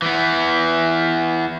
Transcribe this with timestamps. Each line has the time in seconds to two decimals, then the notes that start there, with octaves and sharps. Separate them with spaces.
0.02 E3 B3